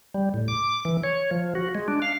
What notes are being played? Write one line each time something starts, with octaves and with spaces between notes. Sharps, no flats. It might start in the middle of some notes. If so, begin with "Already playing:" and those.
G3
A2
D6
E3
C#5
F3
F#4
G#3
D4
F5